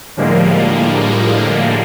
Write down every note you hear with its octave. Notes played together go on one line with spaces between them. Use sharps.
A2 D3 F3 G3 G#3 A#3